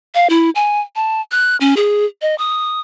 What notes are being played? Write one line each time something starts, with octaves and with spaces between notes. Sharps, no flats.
F5
E4
G#5
A5
F#6
C#4
G#4
D#5
D#6